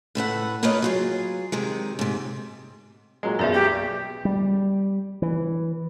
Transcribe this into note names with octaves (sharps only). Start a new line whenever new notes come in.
A2 A3 B4 F#5
A#3 D#4 F4 B4 C#5 D#5
F#3 F4 G#4
C3 D#3 G#3
G#2 C3
A#2 F#3 G#3
B1 F#2 G#4 D5 E5
G4
G3
E3